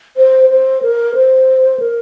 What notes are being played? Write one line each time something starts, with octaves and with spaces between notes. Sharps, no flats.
C5
C5
A#4
C5
A#4